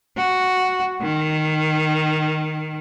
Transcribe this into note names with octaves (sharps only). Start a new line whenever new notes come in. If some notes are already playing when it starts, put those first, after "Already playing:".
F#4
D#3